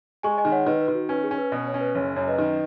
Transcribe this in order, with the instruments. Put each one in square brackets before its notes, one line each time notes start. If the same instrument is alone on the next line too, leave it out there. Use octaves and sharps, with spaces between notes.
[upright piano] G#3 [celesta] G#5 C#6
[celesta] D#5 G#5
[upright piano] D#3
[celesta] C#5 F#5
[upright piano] D#3 [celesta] B4 D#5
[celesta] B4
[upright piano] D#3
[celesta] F#4
[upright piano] C#4 [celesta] B4
[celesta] G#4
[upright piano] C#4
[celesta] B4
[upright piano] B2
[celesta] C#5
[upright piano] C#4
[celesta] B4
[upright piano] F#1 [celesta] C#5
[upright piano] F#2 [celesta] C#5
[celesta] B4 D#5
[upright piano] D#3